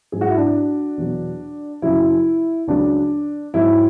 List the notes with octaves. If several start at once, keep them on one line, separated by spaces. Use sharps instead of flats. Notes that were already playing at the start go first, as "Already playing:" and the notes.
G#2 F#3 G#4
F#4
E4
D4 F#4
E2 B2 F#3
F#2 C#3 F#3 E4
C#2 C#3 F#3 D4
G#2 F#3 E4